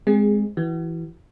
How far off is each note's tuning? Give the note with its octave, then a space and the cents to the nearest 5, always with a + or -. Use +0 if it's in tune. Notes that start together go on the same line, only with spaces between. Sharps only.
G#3 +0 C4 +0 G#4 -15
E3 +0 F#4 +35